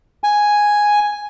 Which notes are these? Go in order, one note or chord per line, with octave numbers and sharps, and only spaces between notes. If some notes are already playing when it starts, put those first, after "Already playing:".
G#5